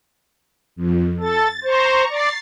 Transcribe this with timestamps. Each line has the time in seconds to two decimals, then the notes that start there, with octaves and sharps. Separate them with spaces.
0.76 F2
1.20 A4 A6
1.64 C5 A#5 C#6
2.10 D5 A6 C7